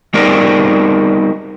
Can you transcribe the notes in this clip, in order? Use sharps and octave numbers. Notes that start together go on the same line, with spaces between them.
G3 B3 D#4 F#4 A#4 D5